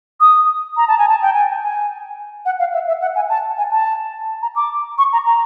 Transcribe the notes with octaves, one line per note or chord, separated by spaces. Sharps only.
D#6
A#5
A5
G#5
A5
G5
G#5
G#5
F#5
F5
E5
E5
F#5
G#5
A5
G#5
A5
A#5
D6
C#6
A#5
A#5